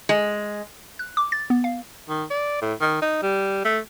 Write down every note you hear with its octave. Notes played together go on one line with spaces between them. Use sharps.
G#3
F#6
D6
A6
B3
F5
D#3
D5
A2
D#3
D#4
G3
A3